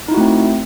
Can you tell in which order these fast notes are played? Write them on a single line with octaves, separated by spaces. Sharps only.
D#4 E4 F#4 A3 C4